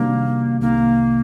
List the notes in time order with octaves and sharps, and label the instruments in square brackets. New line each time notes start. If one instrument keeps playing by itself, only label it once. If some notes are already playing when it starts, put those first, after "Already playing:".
Already playing: [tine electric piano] C3 D#3 G3 D4 F#4 [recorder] A#3
[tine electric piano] C2 C3 D#3 [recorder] A#3